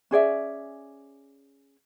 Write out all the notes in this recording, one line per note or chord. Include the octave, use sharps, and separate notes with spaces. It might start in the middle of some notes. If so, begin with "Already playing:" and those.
C#4 G#4 D5 E5